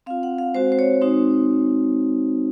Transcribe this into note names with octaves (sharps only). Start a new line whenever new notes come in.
C4 F4 F5
F#5
F5
G#3 C4 F#4 C5
C5
C#5
G#3 C4 D#4 F#4